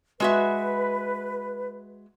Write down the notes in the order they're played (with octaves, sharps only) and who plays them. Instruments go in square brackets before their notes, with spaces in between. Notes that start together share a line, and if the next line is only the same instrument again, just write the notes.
[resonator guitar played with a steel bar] G#3 F#4 E5 [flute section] B4